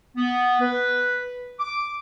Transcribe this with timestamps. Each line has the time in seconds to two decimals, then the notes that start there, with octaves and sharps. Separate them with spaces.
0.16 B3
0.61 B4
1.60 D6